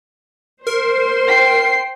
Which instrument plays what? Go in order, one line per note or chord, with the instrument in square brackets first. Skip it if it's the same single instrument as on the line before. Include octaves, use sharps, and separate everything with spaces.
[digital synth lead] A#4 [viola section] C5 C6
[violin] G5 C7